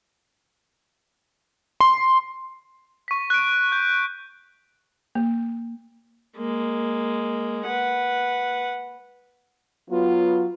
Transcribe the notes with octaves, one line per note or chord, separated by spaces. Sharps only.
C6
C#6 B6
F#6 D7
G6
A#3
G#3 A#3
B4 F#5
F#3 B3 F4